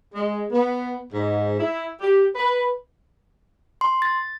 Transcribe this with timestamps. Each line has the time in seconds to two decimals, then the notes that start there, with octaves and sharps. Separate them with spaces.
0.15 G#3
0.51 B3
1.12 G#2
1.59 E4
2.01 G4
2.36 B4
3.81 C6
4.02 A6